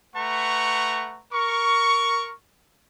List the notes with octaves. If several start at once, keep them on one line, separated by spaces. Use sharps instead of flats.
A3 B4 F#5 A#5 C#6
A#4 C#6